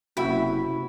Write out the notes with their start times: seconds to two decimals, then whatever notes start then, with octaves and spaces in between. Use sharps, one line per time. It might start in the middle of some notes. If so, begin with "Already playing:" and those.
0.17 F#1 C3 E4 F#4 G5 B5 E6